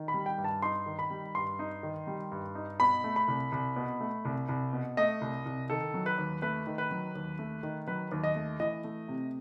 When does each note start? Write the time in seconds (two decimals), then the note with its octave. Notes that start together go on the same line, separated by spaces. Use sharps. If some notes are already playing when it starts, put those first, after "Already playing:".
Already playing: D#3
0.08 B5
0.14 G3
0.26 G5
0.38 G2
0.44 A5
0.62 D#4 C6
0.86 D#3
0.99 B5
1.10 G3
1.35 G2 C6
1.59 D#4
1.83 D#3
2.07 G3
2.32 G2
2.55 D#4
2.80 B2 B5
3.04 A3
3.16 B5
3.28 C2
3.52 C2
3.76 B2
4.00 A3
4.25 C2
4.49 C2
4.73 B2
4.97 A3 D#5
5.21 C2
5.46 C2
5.70 D#3 A4
5.94 F#3
6.06 B4
6.18 D#2
6.42 A3 B4
6.67 D#3
6.78 B4
6.91 F#3
7.15 D#2
7.39 A3
7.63 D#3
7.87 F#3 B4
8.12 D#2
8.23 D#5
8.36 A3
8.60 E3 D#5
8.84 A3
9.08 C3